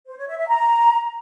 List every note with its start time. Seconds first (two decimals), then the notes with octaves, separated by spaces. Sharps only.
0.06 C5
0.17 C#5
0.27 E5
0.38 E5
0.48 A#5